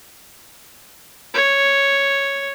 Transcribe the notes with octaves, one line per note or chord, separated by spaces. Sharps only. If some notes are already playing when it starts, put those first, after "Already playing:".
C#5